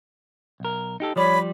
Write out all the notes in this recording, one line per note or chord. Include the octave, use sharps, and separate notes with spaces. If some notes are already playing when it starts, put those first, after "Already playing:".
B1 A#4
D#4 G4 A4
F3 G3 C#5 D5 B5